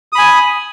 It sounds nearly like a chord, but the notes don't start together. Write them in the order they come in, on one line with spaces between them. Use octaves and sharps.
D#6 B5 G#5